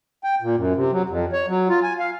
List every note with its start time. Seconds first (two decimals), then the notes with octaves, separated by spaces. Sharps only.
0.24 G5
0.42 A#2
0.56 F#2
0.76 C3
0.92 F#3
1.09 F2
1.32 C#5
1.47 F#3
1.69 F4
1.83 G#5
1.99 F5